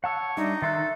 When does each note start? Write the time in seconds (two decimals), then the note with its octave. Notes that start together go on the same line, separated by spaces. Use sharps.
0.04 C#5 F#5 A5 E6
0.37 G3 D4 D#4 E5
0.62 D#3 A4 E5 C6 F#6